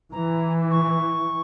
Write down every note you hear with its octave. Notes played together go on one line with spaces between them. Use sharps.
E3 A#5
C#6